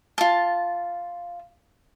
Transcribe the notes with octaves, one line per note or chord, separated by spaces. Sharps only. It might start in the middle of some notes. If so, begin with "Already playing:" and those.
F4 A5